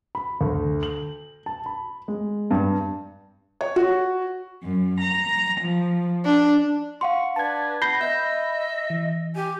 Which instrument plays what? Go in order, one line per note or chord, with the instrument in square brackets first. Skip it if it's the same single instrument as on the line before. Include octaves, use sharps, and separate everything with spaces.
[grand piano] B5
D2
F#7
A5
B5
G#3
G2
[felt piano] C#5
F#4
[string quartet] F#2
A#5
F3
D4
[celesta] F5 F#5 C6 [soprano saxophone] C#6
[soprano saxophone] D4 [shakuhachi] B4 [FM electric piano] A5 G#6
[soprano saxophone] B3 [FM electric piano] B5 A#6 [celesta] G6 C7 G7
[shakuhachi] D#5 [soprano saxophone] E5 [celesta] G6
[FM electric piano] E3
[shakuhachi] G4 [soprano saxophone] G#5